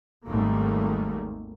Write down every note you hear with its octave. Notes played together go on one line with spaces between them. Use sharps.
G#1 D#2 G#2 G3 A3 A#3